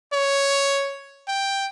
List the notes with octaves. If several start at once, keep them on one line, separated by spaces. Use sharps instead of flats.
C#5
G5